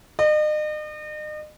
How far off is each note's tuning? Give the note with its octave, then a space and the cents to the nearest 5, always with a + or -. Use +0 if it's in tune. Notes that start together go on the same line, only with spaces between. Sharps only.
D#5 -40